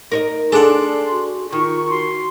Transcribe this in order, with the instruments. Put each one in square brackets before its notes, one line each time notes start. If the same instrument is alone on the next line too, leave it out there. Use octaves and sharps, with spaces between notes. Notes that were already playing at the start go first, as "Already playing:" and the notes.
[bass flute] D#4 [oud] A#4 C#5 D#5
[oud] D4 A4 [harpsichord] G#4 F#5 [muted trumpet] C6
[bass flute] F#4
[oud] D#3 [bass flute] F4 [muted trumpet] C#6
[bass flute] F#4 [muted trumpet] C6